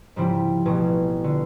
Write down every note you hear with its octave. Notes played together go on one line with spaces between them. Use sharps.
G#2 C#3 F3 G3 C4 E4
A1 B2 G#4 A5
D3 F4